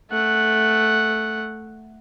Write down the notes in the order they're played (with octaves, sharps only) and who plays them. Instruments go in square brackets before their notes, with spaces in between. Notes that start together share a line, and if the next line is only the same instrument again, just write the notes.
[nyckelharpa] A3 F#5